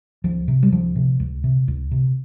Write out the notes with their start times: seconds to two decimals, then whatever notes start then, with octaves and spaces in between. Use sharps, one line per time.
0.24 C#2 F3
0.48 C3
0.63 G3
0.72 C#2 F3
0.96 C3
1.20 C#2
1.44 C3
1.68 C#2
1.91 C3